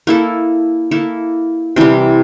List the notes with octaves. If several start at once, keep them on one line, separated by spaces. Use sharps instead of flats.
A#3 E4 A4
A#3 E4 A4
C3 E3 G3